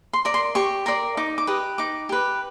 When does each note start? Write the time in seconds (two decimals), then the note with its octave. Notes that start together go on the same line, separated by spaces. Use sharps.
0.13 C6
0.25 A#4 D5
0.34 C6
0.55 G4 C#6
0.86 A#4 D5 C6
1.17 D#4 D6
1.38 D6
1.47 G4 B4 D#6
1.78 D#4 D6
2.09 G4 B4